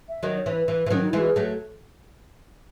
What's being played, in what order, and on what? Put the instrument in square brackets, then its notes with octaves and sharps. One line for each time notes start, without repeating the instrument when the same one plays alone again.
[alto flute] E5
[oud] D#3 F#3 [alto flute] D#5
[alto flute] C#5
[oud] E3
[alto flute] B4
[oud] E3
E3
[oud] D#3 F#3 [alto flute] C#4
[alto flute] D#4
[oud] E3 G#3 [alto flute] E4
[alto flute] F#4
G#4
[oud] F#3 A3